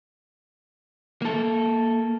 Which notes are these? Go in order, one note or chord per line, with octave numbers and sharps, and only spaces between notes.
A#3 A4